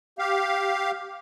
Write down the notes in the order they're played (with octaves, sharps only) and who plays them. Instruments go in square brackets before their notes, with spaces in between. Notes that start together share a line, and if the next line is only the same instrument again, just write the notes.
[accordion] G4 F5